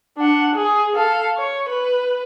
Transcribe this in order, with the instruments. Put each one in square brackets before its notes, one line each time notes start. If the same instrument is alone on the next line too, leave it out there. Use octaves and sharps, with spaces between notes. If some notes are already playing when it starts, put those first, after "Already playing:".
[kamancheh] D4 F#5
G#4
A4 F5
C#5
B4